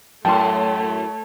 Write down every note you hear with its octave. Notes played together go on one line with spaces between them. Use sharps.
F#2 A2 A3 C#5 G5 A5 C6